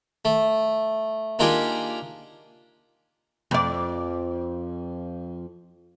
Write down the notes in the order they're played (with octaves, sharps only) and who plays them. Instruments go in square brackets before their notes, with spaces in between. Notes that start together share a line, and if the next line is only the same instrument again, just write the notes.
[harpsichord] A3
A#3 D4 D#4 F4 G4 G#4
[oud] F2 D5